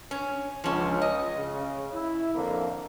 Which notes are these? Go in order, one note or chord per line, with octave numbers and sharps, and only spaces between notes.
C#4
C#2 F3 C#4
D#5
C#3
E4
F2 D3 A#3